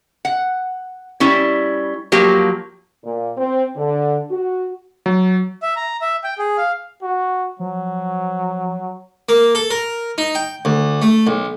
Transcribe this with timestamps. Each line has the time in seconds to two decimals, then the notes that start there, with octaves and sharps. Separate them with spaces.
0.25 F#5
1.20 G3 C#4 E4
2.12 F3 F#3 A#3 G4
3.04 A#2
3.37 C4
3.76 D3
4.30 F#4
5.06 F#3
5.63 E5
5.76 A#5
6.01 E5
6.24 G5
6.39 G#4
6.57 F5
7.02 F#4
7.59 F3 F#3
9.29 A#3
9.55 A4
9.71 A#4
10.18 D#4
10.35 G5
10.65 D2
11.02 A3
11.27 B1